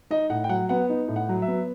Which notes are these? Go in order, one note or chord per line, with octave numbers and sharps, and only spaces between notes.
D#4 D#5
A2 F#5
G5
F#3 F#5
B3 F#5
D#4
A2
F#5
F#3
E5
B3